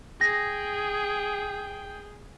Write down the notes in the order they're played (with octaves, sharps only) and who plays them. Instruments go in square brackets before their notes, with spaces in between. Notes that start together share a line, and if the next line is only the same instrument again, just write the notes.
[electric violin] G#4 [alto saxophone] G5 [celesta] A#6